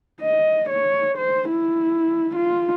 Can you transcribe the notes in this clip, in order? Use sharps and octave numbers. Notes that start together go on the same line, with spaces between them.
D#5
C#5
C5
E4
F4